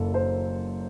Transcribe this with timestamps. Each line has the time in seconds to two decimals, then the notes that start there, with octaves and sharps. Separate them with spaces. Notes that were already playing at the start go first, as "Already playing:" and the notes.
Already playing: F#1 F#2 A4
0.14 C5